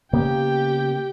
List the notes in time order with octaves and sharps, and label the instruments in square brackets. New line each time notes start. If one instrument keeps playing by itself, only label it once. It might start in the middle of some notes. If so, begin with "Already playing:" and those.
[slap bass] C#3 A#3 B3 [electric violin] G4 G5